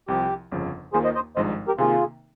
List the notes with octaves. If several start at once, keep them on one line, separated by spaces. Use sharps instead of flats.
C2 C3 F3 G4
G1 F2 C#3 F3
D#2 D#3 A#3 F4 G#4 C5
C5 D#5
C5 D#5
G#1 G2 F3 G#3 D#4 C5 D#5
G4 A#4
C3 D#3 A#3 F4 G#4